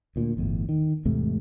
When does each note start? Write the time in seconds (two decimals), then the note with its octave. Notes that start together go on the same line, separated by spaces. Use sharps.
0.16 D2 A#2
0.37 G1 E2 A2
0.69 D#3
1.05 E2 G#2 C3 A3